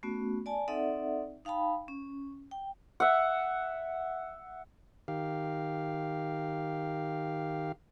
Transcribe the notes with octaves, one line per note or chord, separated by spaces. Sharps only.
A3 B3 C#4 F#4
D5 G#5 A5
C4 D#4 A4 D5 E5 F#5
D#4 F5 G5 A5 B5
C#4
G5
E5 F#5
D#3 G4 F5